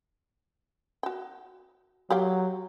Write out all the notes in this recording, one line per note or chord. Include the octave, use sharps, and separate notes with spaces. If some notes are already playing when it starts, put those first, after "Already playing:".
F#4 G5
F#3 G4 F5 G5